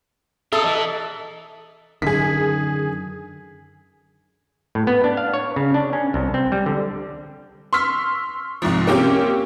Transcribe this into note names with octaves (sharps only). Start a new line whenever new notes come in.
F4 A4 A#4 E5 D#6 E6
E3 D#5
F#2 D3 D#3 G#4 B6
A2
B3
D4
F5
C#5
C#3
D4
C#4
C2
C4
G3
D3
C6 C#6 E6 F6 B6
C2 G#2 F3
A#3 C4 C#4 G4